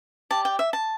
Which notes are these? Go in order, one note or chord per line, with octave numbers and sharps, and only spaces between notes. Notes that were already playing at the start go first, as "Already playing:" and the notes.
G4 D5 A5
G5
E5
A5